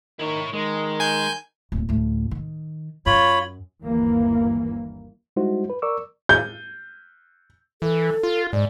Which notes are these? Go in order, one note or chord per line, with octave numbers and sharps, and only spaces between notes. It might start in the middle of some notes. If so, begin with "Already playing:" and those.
D#3 E4 C#5
D#3 G#3
G#5 G6
D1 A#2
D2 A2
D#3
F#2 F4 C#5 B5
G1 D#2 E3 A#3
G3 G#3 D#4 E4 F#4 C5
B4
A#4 D5 C#6 D6 E6
G6
E3 A4
F4
G#2 D5